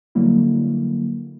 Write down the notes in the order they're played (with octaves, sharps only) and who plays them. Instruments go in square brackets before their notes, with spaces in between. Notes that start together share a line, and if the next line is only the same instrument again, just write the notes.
[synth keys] D3 F#3 G3 A#3 E4